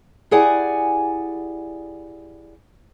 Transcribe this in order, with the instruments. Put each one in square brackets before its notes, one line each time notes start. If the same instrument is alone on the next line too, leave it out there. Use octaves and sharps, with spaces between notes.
[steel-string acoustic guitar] E4 G4 G#4 D5 F#5 G#5